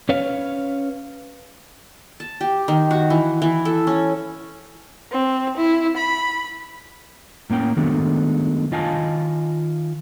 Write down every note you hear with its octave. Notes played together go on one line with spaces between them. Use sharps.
C#4 B4 C#5 F5
A5
G4
D#3
F#4
E3
E3
A4
C#4
C4
E4
B5
A2 A#3 C#4 G5
D#3 F#3 G#3 A3 B3 D4
D#3 F4 D#5 F5 G#5 A5